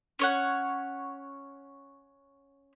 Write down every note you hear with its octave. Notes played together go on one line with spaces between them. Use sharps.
C#4 C#5 F#5